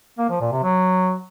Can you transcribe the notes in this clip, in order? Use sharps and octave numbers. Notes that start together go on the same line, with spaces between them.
A#3
F3
A#2
C3
F#3